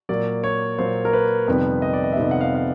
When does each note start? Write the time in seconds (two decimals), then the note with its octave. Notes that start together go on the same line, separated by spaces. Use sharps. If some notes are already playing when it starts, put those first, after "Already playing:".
0.09 A#2 F#3 A#3 D5
0.44 C#5
0.79 A#2 F#3 A#3 C5
1.05 A#4
1.13 B4
1.47 F2 C3 D#3 G3 B3 B4
1.82 D#5
1.93 D5
2.04 D#5
2.12 E5
2.17 F2 C3 D#3 G3 B3 D#5
2.31 F#5
2.41 F5
2.55 F5